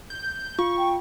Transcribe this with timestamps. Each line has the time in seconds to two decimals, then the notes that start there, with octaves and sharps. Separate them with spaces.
0.10 G6
0.59 F4 C#6
0.78 G5